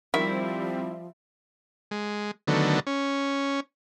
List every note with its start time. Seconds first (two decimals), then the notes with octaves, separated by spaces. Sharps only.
0.14 D#3 F3 G3 C4 E4
1.91 G#3
2.48 D3 D#3 F#3 A3 B3
2.87 C#4